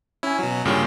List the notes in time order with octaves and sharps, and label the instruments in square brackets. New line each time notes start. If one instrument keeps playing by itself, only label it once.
[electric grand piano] C#4 G#5 [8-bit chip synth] E4
[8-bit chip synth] B2 F#3
[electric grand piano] G2 A#2 C#3 [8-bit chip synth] C#4 G5